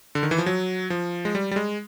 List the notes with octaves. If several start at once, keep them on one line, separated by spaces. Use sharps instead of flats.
D3
D#3
E3
F3
F#3
F3
G#3
G3
G3
G#3